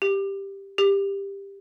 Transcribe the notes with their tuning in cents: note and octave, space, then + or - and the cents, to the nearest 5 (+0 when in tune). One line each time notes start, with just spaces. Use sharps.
G4 +5
G4 +15